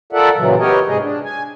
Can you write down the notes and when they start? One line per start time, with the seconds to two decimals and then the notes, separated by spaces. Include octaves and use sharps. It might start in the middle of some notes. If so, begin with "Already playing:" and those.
0.13 F4 A4 A#4 D5 E5 F#5
0.36 A#2 C#3 E3 F#3
0.59 B3 G4 A#4 C#5 D#5
0.87 G#2 C3 G#3 G#4 D#5
1.02 D4
1.24 G#5